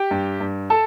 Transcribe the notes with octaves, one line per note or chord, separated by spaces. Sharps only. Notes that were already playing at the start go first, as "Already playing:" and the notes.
Already playing: G4 G5
G2
G2
A4 A5